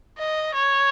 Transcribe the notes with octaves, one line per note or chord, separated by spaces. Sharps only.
D#5
C#5